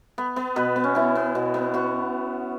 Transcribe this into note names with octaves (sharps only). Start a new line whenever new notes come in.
B3
B3
B2 B4
B3
C#4
B3 E4
B3
B2
B3
B3 F#4